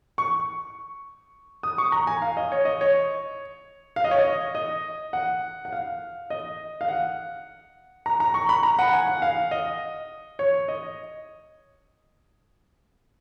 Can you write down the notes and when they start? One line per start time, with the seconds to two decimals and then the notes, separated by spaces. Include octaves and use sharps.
0.18 C#6
1.63 D#6
1.78 C#6
1.92 A#5
2.07 G#5
2.22 F5
2.37 D#5
2.52 C#5
2.65 D#5
2.81 C#5
3.96 F5
4.04 D#5
4.11 C#5
4.19 D#5
4.55 D#5
5.13 F#5
5.65 F#5
5.73 F5
6.30 D#5
6.81 F5
6.88 F#5
8.06 A#5
8.20 A#5
8.34 C#6
8.49 B5
8.63 A#5
8.79 F#5
8.93 G#5
9.07 F#5
9.22 F5
9.51 D#5
10.39 C#5
10.68 D#5